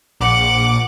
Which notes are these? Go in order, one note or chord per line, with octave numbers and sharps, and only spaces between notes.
A#1 F#5 D6